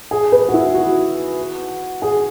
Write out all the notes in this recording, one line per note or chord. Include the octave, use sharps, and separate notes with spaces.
G#4
B4
F#4
E4
F#4
G#4